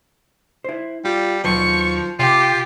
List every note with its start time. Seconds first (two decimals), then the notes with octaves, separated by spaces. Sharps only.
0.64 E4 C5
1.05 G3 F4
1.44 D#2 F3 F#3 B4 C#6
2.19 C3 F4 G4